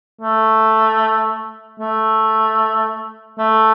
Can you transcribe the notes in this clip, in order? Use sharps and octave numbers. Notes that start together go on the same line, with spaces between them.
A3
A3
A3